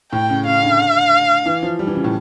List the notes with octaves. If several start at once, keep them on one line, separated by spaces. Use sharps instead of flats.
A2 G5
C#3
C#3 F5
D3
E3
F3
G3
E3
C#3
A2